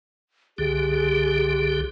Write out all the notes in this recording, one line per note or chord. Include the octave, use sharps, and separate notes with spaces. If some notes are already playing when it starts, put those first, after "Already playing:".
C2 D3 G4 G#4